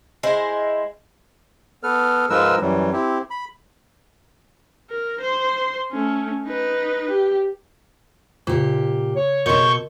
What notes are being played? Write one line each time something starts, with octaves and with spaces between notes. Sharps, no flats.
G#3 E4 C5
B3 A4 B4 F6
G#2 F3 G#3 A#4 B4 E6
F#2 E3 F#3 G3
C4 E4 G4
B5
A#4
C5 C6
A3 C#4
D#4 B4
G4
A#2 C#3 G4
C#5
B2 A4 A#4 D#5 C6 C#6 G6